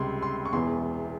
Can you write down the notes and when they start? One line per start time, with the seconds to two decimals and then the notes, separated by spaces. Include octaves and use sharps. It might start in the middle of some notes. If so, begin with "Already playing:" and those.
Already playing: C#2 C3 G3 C6
0.22 C6
0.45 C#6
0.53 E1 E2 E3 C6